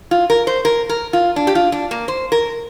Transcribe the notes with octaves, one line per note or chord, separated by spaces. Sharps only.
F4
A#4
C5
A#4
A#4
F4
D4
G4
F4
D4
A#3
C5
A#4